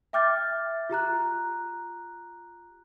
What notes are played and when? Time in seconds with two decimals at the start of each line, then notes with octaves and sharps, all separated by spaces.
0.13 E5 G5 D6 F6 G6 A6
0.90 F4 G4 A#5 F#6